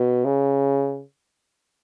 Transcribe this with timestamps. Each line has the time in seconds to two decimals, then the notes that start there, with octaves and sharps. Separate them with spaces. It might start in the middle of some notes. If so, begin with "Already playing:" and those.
Already playing: B2
0.25 C#3